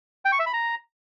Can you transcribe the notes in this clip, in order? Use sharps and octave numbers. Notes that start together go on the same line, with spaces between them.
G5
C#6
E5
B5
A#5